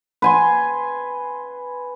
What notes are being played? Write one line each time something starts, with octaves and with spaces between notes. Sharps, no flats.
B4 G#5 C6